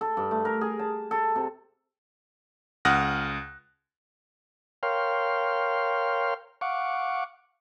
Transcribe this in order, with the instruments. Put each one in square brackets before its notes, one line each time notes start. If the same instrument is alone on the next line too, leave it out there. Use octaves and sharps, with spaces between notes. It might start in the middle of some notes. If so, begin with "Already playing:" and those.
[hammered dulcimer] A4
G2
A3
A#4
G#4
A5
A4
C3
[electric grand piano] C#2 F#5 D#6 F6 F#6 A#6
[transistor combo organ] A#4 C#5 F5 G5 C6 F6
F5 F#5 C#6 D6